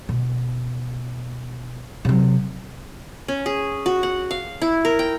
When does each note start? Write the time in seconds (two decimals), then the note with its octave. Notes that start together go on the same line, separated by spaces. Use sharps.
0.09 B2
2.05 C3 F#3
3.28 C#4
3.46 G#4
3.86 F#4
4.03 F#5
4.31 F5
4.62 E4
4.85 A#4
4.99 G5